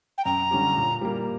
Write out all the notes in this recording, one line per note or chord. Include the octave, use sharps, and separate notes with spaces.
G5
F#2 A#5
D3 G3 C#4 G4
A#2
G3 A#3